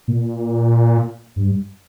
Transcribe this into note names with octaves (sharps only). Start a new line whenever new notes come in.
A#2
G2